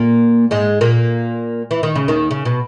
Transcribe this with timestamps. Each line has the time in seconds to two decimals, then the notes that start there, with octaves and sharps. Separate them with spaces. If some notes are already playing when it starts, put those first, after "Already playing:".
Already playing: A#2 A#3
0.51 G#2 G#3
0.81 A#2 A#3
1.71 E3
1.83 D#3
1.95 C#3
2.08 D#2 D#3
2.31 C#3
2.45 B2